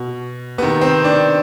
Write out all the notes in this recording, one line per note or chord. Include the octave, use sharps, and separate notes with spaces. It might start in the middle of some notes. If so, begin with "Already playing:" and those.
Already playing: B2
C3 D#3 B3
C4
D4